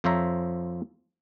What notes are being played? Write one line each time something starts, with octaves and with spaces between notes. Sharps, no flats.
F2 F3 C5 C#5 E5 A#5